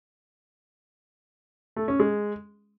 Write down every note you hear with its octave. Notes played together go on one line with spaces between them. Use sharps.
A3
C#4
G#3